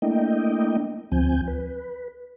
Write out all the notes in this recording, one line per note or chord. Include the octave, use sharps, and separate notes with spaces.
A3 A#3 D4 E4 D#5 G5
D2 F3 C4 G#5 G6
B4